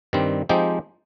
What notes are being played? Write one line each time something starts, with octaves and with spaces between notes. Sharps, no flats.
G2 D#3 G3 C4
F3 G#3 C4 D#4 G4